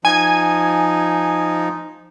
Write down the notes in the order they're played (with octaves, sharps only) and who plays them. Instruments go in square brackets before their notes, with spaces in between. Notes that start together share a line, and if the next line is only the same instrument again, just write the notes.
[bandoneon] F3 D#4 [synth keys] G#5